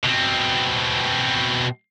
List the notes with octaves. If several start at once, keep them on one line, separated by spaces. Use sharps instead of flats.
B2 C4